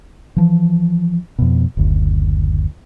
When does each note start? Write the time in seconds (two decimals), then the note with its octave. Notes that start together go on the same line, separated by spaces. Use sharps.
0.36 E3 F3
1.39 F2 B2
1.77 F#1 D2